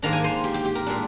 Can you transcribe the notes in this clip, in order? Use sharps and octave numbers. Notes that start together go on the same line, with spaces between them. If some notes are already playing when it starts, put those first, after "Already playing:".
G#2 D#3 A#3 D4 A#5
G#5
C5
G4
G4
G4
A#4
A#2 G#3 D4